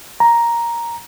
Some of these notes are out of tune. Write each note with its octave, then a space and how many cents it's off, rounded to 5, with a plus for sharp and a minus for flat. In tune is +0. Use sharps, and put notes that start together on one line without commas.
A#5 +5